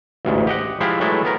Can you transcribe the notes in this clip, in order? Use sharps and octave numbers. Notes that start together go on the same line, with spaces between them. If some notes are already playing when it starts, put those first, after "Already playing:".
A1 D2 G#2
G4 D#5 F#5
F3 G#3 E4 G4 E5 F5
E3 F#3 G#3 A3 E4 A5
B3 A#4